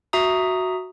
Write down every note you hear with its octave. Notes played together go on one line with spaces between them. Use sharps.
F#4 E5 A#5 D#6